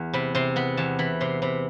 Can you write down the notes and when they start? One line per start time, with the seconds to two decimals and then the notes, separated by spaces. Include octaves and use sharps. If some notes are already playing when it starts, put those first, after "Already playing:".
Already playing: E2
0.13 C3 B5
0.35 C3 C6
0.56 B3 B5
0.77 E2 A5
0.99 E3 B5
1.21 C3 C6
1.42 C3 B5